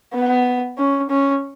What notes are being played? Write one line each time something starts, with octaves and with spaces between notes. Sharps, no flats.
B3
C#4
C#4